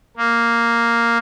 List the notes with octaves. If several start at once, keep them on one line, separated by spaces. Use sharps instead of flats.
A#3